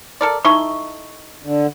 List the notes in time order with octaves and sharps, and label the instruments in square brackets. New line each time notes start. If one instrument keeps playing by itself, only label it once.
[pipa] A4 A#4 D5
[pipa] D#4 E4 A4 [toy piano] C#6
[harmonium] D3